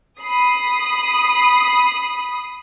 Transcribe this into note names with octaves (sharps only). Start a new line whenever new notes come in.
B5 D#6 C7